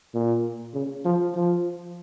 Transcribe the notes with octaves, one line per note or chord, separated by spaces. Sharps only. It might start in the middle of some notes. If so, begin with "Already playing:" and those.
A#2
C#3
F3
F3